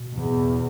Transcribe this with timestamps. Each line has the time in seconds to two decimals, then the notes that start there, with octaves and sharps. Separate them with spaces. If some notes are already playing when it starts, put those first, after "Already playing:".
Already playing: B2
0.17 E2